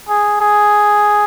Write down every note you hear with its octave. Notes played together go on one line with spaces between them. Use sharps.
G#4
G#4